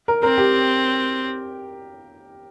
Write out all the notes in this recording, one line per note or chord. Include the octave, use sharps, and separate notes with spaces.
A#4
C4 A#4
G4